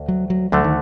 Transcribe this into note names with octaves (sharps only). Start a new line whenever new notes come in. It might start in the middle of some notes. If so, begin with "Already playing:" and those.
Already playing: D2
F#3
F#3
D2 D3 F#3 A3
D#3